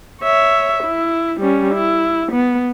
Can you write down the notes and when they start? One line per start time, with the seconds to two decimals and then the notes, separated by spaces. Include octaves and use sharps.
0.22 C#5 E5
0.83 E4
1.40 G3 C#4
1.74 E4
2.32 B3